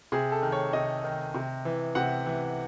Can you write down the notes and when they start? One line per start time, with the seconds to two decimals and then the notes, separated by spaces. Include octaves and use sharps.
0.12 C3 G#4
0.32 A4
0.42 D#3
0.52 C#5
0.73 C3 D#5
1.04 D#3
1.34 C3
1.65 E3
1.95 C3 F#5
2.26 E3